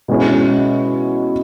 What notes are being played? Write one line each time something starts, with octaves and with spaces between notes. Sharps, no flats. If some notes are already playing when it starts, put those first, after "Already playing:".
B2 G#3 C#4 E4